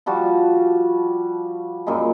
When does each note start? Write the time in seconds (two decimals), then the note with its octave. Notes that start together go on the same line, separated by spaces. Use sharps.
0.06 F3 G3 F#4 A5
1.87 F#2 A#2 G3 G#3